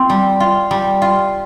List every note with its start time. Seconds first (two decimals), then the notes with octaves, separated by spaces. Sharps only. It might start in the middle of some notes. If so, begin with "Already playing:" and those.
Already playing: C4 F4
0.09 G3
0.40 F4
0.71 G3
1.02 F4